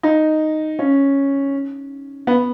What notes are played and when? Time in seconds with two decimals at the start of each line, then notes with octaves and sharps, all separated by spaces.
0.03 D#4
0.79 C#4
2.27 B3